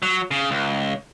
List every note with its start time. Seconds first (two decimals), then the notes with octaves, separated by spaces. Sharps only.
0.02 F#3
0.31 C#3
0.51 C#2